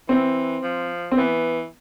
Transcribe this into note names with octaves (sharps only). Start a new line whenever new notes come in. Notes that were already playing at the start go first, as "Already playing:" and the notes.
E3 C4
F3
C4
E3 B3